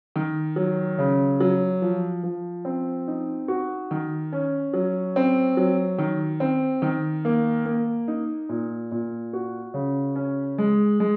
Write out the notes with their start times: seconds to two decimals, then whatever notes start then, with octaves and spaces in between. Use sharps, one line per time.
0.16 D#3
0.56 F#3
0.98 C#3
1.40 F#3
1.82 F3
2.23 F3
2.65 C4
3.08 D#4
3.48 F#4
3.91 D#3
4.32 C#4
4.73 F#3
5.16 C4
5.57 F#3
5.98 D#3
6.40 C4
6.82 D#3
7.25 A#3
7.66 A#3
8.08 D#4
8.49 A#2
8.92 A#2
9.33 F#4
9.74 C#3
10.16 C#4
10.58 G#3
11.00 G#3